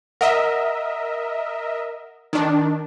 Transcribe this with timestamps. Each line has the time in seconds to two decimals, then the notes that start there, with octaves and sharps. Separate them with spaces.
0.21 A#4 D#5 E5 F#5
2.33 D#3 D4